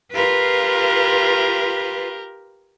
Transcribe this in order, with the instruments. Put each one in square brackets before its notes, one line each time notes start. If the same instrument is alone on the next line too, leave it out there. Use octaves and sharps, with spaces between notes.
[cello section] F4 B4 [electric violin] G4 A#4